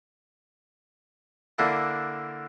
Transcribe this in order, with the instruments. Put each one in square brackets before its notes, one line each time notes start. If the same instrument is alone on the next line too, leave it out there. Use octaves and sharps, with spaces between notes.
[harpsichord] D3 A#3 D4 E4